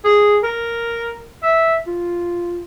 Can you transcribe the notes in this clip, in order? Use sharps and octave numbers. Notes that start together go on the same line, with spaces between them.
G#4
A#4
E5
F4